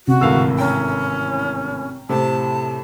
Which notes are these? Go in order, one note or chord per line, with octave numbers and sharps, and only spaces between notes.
C3 F#4
G#1 D2 A2 E3 F5 E6
C#4 G5 A#5
A2 C3 C4 A5